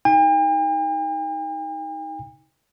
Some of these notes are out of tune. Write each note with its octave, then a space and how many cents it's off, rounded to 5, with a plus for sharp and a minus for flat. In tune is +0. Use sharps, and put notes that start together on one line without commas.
D#4 +20 G5 +45